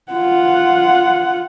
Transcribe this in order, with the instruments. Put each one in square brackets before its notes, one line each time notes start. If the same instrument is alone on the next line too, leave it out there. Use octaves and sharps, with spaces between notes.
[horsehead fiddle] F4 F#5